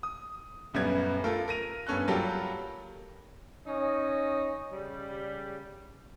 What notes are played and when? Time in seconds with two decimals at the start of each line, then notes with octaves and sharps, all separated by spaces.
0.03 D#6
0.74 D#1 F#2 G3 B3 G#6
1.24 A3 F4 A4 A#4
1.48 A#4 A#6 D#7 F7
1.87 G2 B3 C#4 A4 F#6
2.08 F#3 G3 A#3 F4 G4 A4
3.67 C#4 D#4 D#5
4.72 C#3 G3